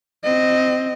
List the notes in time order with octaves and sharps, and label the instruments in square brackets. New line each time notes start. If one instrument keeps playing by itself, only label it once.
[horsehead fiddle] C4 D#5